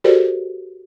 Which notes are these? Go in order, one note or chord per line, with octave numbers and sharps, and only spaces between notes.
F#4 G4 A4 A#4 C5 D5